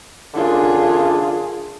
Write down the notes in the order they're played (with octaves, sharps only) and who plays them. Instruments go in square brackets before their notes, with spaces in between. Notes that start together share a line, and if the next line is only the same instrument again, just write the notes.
[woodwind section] F#2 D3 D4 [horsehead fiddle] F4 G#4